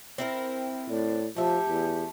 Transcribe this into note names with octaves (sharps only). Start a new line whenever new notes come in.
C4 E4 A#4
G5
A2 D5
F3 A3 G4 E5
E2